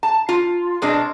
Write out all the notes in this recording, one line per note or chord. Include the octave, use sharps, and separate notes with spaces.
A5
F4
B2 G#3 C4 D4